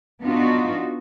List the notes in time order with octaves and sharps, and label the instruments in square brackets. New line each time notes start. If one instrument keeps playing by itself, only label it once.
[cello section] B3 D4 D#4 F4 F#4